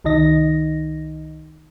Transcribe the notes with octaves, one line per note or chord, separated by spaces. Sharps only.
C2 D#3 D#4 D#5 A#6